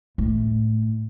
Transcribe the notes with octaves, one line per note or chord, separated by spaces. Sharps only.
A2